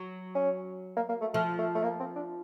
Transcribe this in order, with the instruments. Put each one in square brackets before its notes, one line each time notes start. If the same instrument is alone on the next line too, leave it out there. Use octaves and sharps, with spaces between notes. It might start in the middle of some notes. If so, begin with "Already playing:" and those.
Already playing: [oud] F#3
[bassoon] C#4
A#3
A#3
A3
[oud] F3 [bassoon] A3
[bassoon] A3
A3
A#3
C4
D4